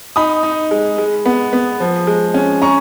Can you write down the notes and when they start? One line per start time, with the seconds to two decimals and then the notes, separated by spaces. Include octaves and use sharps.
0.16 D#4 B5 D#6
0.43 D#4
0.71 G#3
0.98 G#3
1.26 B3
1.53 B3
1.80 F3
2.07 G#3
2.34 C#4
2.62 C#4 A#5 C#6